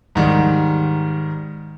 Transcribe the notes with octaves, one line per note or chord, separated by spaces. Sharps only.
G#2 D#3 G3